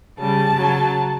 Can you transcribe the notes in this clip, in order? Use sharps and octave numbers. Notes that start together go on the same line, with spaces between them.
C#3 G3 A5
C#3 F#3